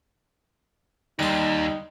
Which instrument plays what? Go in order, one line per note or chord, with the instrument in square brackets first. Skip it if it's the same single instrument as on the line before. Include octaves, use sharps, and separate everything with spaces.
[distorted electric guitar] D#2 [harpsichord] G3 C6 [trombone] D#4